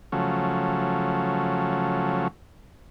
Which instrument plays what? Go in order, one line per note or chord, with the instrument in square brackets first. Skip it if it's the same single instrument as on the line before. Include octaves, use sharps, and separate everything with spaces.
[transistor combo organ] C#3 F3 F#3 A3